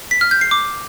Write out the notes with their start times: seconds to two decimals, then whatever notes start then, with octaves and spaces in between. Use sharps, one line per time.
0.11 B6
0.21 F6
0.31 G6
0.41 C7
0.51 D6